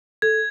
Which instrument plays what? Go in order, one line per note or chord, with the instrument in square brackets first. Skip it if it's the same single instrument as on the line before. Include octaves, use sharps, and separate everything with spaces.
[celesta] A4 [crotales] G#6